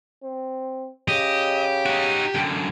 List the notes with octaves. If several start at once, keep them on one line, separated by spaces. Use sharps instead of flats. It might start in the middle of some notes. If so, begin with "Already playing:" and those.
C4
C#3 G4 D#5
D#4 F#4
F#2 D3